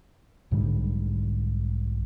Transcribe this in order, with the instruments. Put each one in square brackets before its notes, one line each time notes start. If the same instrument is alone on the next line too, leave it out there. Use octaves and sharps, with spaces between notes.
[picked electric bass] B1 G#2 D3 G3